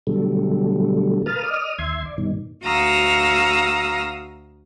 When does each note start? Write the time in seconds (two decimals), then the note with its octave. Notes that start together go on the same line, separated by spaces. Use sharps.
0.07 B2 D3 F#3 G3 A3
1.26 A#4 B4 F5 A5 D#6 F6
1.44 D5 D#5 D#6 F6
1.78 D#2 E5 C6 G#6
2.05 D5
2.18 G2 B2 D#3
2.63 D2 F#4 F5 A#5 D#6 E6